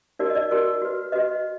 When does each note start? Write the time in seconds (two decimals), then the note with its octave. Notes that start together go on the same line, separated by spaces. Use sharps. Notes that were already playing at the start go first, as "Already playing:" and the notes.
0.19 D#4 F#4 A#4 D5
0.30 D#5
0.35 D5
0.51 D#4 F#4 A#4
0.82 F#4 B4
1.12 F#4 B4 D#5